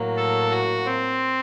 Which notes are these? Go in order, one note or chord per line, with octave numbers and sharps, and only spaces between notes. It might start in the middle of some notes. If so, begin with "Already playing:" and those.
Already playing: A2 F#3 A#3
A4
F#4
C4